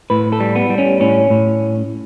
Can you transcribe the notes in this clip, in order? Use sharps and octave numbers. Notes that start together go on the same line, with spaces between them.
A2 B4
A4
G3
B3
G3
C#4
A2 C#4
A2